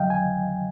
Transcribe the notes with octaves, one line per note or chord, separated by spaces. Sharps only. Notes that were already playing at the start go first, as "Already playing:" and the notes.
Already playing: F2 D3 F#3 D#5 F5 G5
G#5